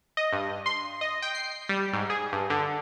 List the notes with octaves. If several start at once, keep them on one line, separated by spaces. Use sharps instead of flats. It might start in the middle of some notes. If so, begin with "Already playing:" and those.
D#5
G2
C6
D#5
G5
C7
G3
G#2
G#4
G2
D3